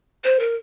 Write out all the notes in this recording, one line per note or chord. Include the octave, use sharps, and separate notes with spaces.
C5
A#4